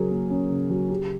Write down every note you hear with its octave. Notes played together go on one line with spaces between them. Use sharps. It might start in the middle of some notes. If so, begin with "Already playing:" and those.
Already playing: C#3 F#3 G#4 A#4
A#3
C#4
C#3
F#3
C#3 G4